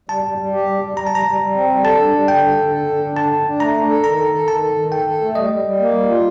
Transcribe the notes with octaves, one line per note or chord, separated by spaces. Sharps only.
G3 A5
G3
G3
G4
G3
G3
G3 A#5
A5
G3 A#5
G3
G3
C4
G3
A4 A5
D4
G3
D3 G5
A4
D3
A4
D3
D4
D3 A5
D4
D4
A3 A#5
D4
A4
D#3 A#5
A4
A4
D#3 A5
A4
D#3
A4 G5
A4
A3
G3 D#5
G3
G3
A#3
G3
F4